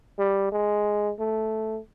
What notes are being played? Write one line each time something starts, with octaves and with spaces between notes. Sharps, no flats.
G3
G#3
A3